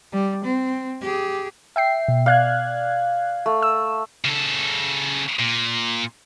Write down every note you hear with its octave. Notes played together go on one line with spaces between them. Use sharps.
G3
C4
G4 G#4
E5 G5 C7
B2
D5 F5 F#6 G#6
A3
E6
C#3 A4
A#2